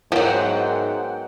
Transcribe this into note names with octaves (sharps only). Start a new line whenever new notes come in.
G#2 F3 F#3 B3 A#4 E5 F#5 G5